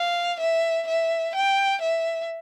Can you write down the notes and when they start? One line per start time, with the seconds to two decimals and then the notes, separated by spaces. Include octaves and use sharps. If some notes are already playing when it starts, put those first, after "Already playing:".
Already playing: F5
0.40 E5
0.87 E5
1.35 G5
1.81 E5